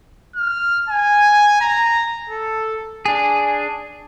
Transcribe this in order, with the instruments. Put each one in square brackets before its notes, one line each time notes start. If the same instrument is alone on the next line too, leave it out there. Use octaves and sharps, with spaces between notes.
[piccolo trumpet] F6
G#5
A#5
A4
[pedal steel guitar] D4 G#4